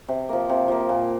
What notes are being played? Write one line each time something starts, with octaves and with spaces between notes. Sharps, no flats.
C3
F3 A#3
C3
F3 A#3
A#2